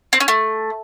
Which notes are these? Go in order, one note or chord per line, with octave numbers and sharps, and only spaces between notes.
C4
C#4
A3